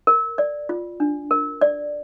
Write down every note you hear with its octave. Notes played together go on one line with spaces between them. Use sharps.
A#4
D5
F4
D4
A#4
D5